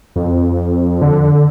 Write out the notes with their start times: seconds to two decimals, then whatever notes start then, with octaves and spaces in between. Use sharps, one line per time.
0.16 F2
1.01 D3